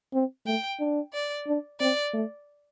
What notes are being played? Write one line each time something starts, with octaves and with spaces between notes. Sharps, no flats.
C4
A3 G5
D4
D5
D4
C4 D5
A3